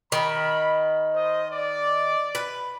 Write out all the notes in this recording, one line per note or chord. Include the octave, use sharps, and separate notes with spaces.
D#3 B5
C5 D#5
D5
B4